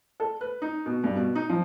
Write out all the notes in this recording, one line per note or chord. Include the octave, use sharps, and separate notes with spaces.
A4
B4
D#4
B2
G2
B2
D#4
F3